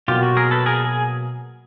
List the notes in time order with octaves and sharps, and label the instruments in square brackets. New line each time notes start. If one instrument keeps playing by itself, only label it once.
[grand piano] B2 F#3 A#3 [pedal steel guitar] F4 G4
[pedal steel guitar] F#4
G#4 A#4
A4 B4
G#4 A#4
G#4